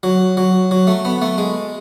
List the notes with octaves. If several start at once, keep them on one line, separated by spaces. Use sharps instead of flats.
F#3
F#3
F#3
A3
B3
A3
G#3